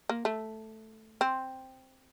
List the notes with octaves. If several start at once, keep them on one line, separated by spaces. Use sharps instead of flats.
A#3
A3
C4